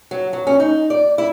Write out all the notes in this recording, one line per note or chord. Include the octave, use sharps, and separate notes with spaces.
F#3
F#3
C#4
D#4
D5
E4